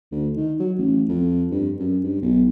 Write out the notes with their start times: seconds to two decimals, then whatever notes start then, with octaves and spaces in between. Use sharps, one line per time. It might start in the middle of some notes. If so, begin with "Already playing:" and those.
0.12 D2
0.36 D#3
0.60 F#3
0.78 A1
1.09 F2
1.51 G2
1.79 F#2
2.04 G2
2.22 B1